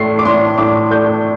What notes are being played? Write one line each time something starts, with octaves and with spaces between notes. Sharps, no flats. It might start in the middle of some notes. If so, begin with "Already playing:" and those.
Already playing: A2 A3 C7
D6
A2 C6
A2 D6
A3 G6